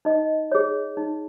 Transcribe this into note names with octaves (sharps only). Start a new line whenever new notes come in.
D#4 D#5
G#4 C#5
D#4